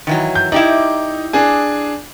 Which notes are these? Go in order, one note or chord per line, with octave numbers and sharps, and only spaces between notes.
D#3 E3 F#3
G6
D#4 E4 G4 D5
D4 G#4 G#5